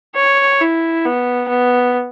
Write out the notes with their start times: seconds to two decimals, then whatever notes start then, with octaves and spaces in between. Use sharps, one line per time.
0.16 C#5
0.61 E4
1.05 B3
1.49 B3